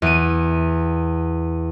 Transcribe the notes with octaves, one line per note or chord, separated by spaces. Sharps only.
E2 D#7